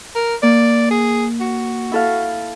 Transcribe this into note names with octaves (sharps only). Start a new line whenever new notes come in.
A#4
A#3 D5
G#4
F#4
E4 A4 F5